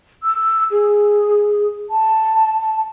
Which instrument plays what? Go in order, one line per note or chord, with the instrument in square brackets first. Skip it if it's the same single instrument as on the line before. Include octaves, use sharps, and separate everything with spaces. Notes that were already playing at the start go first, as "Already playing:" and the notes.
[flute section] E6
G#4
A5